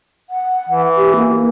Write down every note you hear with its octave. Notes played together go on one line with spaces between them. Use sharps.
F#5
E3
G4
A#3